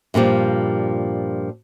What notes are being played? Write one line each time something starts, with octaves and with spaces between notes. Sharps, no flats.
G2 A#2 F3 G3